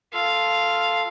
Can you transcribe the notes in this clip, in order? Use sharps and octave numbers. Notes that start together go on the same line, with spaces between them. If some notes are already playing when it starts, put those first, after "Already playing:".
F4 A4 F5